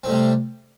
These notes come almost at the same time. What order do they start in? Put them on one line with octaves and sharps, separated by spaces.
C4 A2 G3 C3